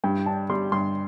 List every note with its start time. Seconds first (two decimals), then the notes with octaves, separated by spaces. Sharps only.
0.04 G2 G5
0.26 D4 A5
0.50 G3 C6
0.72 G2 C6